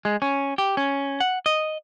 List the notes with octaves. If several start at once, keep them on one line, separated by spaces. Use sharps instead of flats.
G#3
C#4
G4
C#4
F#5
D#5